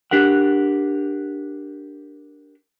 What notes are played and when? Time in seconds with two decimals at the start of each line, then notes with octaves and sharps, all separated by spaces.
0.11 D4 G4 A#4 F#5